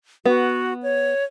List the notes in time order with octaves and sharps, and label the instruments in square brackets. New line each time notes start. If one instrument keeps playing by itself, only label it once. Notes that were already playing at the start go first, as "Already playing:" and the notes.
[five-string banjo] B3 [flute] F#4
[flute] C#5